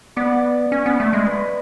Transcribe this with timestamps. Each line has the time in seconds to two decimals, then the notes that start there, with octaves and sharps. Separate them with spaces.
0.16 B3 D5
0.72 C#4
0.86 B3
1.00 A3
1.13 G#3
1.26 B4